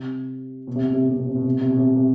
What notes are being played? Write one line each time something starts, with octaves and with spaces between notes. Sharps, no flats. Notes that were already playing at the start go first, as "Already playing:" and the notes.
Already playing: C3
B2
C3
B2
C3
B2
C3
B2
C3
B2
C3
B2
C3
B2
C3
B2
C3